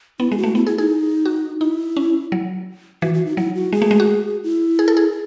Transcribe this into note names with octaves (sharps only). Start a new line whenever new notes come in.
B3 E4
G#3 G#4
F#4
A3
B3 E4
E4 G#4
D#4 G#4
F#4
D#4 E4
C#4
F#3
E3 F#4
F#4
D#4
F#3 E4
F#4
G#3 G#4
A3
G#3
F#4
E4
G#4
A4
G#4